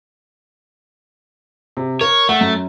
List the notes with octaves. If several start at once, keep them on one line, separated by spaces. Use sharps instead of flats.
C3
A#4 C#5
A3 F#5
F#2